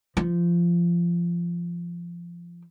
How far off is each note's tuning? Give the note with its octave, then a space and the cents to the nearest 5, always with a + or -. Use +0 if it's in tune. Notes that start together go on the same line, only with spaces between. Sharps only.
F3 -20